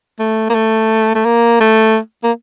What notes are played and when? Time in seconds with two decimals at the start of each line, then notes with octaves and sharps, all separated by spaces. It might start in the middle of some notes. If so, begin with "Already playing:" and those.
0.19 A3
0.50 A#3
0.55 A3
1.15 A3
1.25 A#3
1.60 A3
2.24 A#3